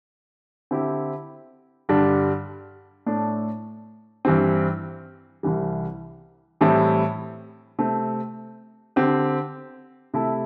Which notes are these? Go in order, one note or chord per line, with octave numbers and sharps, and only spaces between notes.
D3 C4 E4 G4
G2 D3 G3 D4
A2 A3 D4 A4
G2 E3 G3 C4
C2 C3 E3 G3
A2 E3 G3 C4 E4
C3 A3 C4
D3 C4 G4
C3 A3 E4 A4